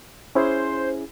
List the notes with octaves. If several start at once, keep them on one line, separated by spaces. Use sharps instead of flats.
C#4 E4 G#4 C5